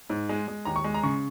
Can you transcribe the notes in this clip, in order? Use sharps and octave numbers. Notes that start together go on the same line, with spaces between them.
G#2
G#3
G#3
D#2 A#5
C#6
G#3
A#5
C#3 C#6